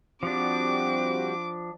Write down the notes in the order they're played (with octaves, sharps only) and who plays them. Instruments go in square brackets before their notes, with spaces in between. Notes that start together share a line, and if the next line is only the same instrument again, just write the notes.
[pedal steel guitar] F3 D4 [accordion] G3 F#4 G4 [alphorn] C4 [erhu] D6